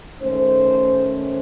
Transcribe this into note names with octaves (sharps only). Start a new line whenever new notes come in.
D#3 A3 C#4 C5